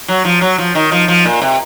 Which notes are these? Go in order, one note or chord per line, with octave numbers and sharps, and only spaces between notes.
F#3
F3
F#3
F3
D#3
F3
F3
A#2
C3